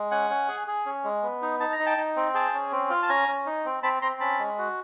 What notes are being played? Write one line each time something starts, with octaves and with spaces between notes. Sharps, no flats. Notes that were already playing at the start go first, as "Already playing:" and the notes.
Already playing: G#3
C#4 F#5 G#5
C#4
G#4
G#4
C#4
G#3
B3
D#4
D#4 A5
A#5
D#4
G5 A5
D#4
C4
G#4 G5 A5
C#4
C4
F4
A5
C#4 G#5 A#5
C#4
D#4
C4
C4 A5 B5
C4 A#5 C6
C#4 A5 B5
G#3
F#4